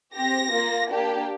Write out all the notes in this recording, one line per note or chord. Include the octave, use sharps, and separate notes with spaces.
C4 G4 A#6
A#3 F4
A#3 D4 G4